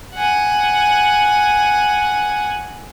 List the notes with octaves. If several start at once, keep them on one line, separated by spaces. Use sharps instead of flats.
F#5 G#5